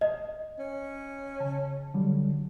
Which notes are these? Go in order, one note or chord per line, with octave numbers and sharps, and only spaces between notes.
D#5
C#4
C#3 A5
D3 F#3 G3